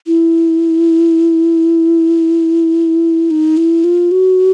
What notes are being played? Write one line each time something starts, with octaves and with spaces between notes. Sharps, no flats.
E4
D#4
E4
F4
F#4